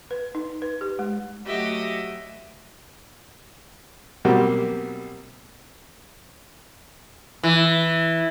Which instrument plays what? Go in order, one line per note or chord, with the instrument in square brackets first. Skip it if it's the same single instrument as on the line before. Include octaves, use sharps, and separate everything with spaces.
[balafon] B4
D#4
B4
G4
G#3
[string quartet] F#3 A3 F#4 G4 D#5 E5
[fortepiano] B2 F#3 G3 A#3 C4
[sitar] E3